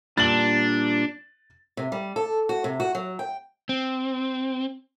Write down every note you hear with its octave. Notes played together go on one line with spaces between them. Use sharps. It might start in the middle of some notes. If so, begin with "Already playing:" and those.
A#2 G3 D4 A6 F#7
C3
G3
A4
F#4
C3
F#4
F#3
G5
C4